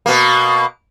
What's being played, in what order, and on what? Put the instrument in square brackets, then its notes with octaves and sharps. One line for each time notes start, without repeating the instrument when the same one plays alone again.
[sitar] B2 A#3